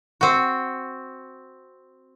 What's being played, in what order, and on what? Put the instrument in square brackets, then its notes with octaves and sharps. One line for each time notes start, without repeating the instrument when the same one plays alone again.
[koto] C4 F#4